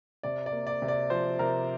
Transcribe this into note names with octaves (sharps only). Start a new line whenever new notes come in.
C3 D5
D5
A#3
D5
C3
D5
F3 C5
C3 A#4